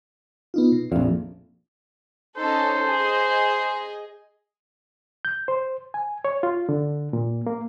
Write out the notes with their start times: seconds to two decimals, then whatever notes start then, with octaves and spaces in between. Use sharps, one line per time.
0.54 B3 D#4 F4
0.72 B2
0.92 A#1 F2 D5 E5 F5
2.37 C#4 D#4 A4 C5
2.86 G#4 D#5
5.25 G6
5.48 C5
5.94 G#5
6.25 C#5
6.43 F4
6.69 D3
7.13 A#2
7.46 A#3